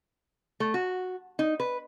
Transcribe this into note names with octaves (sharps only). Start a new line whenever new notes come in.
A3
F#4
D#4
B4